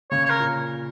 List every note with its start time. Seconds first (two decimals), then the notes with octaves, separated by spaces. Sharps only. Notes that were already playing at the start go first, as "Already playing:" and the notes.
0.11 C#3 C#5
0.25 C#5
0.30 A#4
0.40 A#2